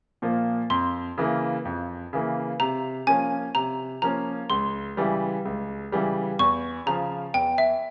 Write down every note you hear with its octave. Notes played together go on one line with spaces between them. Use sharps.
A#2 F3 A#3
F2 C6
C#3 E3 A#3
F2
C#3 E3 A#3
C3 A#5
F3 A#3 C#4 G#5
C3 A#5
F3 A#3 C#4 A#5
C#2 C6
C#3 E3 G3
C#2
C#3 E3 G3
E2 C#6
C#3 F3 A#5
E2 G5
E5